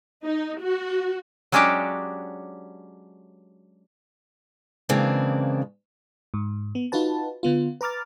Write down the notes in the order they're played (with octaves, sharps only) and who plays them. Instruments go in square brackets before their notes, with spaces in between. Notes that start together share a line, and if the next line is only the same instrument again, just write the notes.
[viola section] D#4
F#4
[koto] F#3 G#3 C#4 D4 F#4 G4
[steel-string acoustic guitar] C#3 E3 G#3 A#3 C4 D4
[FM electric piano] G#2
B3
D#4 F4 F#4 B4 A5
D3 B3 F4
B4 A#5 D6 F6 A6